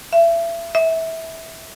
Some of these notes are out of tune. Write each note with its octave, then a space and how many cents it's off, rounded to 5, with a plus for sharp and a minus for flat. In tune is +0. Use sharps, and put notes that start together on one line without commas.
E5 +30
E5 -20